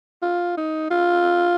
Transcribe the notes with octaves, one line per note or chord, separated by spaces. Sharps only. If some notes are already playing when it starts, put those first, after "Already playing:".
F4
D#4
F4